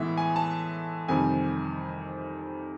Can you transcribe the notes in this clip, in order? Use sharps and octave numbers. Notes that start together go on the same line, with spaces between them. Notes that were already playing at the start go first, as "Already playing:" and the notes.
Already playing: A2 E3 G#3 B3 E5
G#5
A5
F2 C3 D#3 G3 G#5